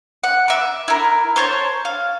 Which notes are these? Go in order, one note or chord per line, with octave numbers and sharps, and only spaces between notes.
F#5
E5 D6
E4 A#4
C5 C#5 A5
F5